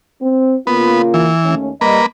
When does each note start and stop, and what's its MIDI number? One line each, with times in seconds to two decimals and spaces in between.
0.21 0.55 60
0.67 1.30 49
0.67 1.30 58
0.67 1.02 59
0.67 1.30 65
1.14 1.55 52
1.45 1.70 39
1.45 1.70 57
1.45 1.70 61
1.81 2.00 55
1.81 2.06 58
1.81 2.06 71
1.81 2.00 75